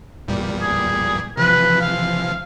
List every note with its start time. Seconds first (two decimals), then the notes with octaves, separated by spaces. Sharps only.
0.28 E2 A#2 G3
0.61 G#4
1.37 C3 E3 F3 B4
1.81 F5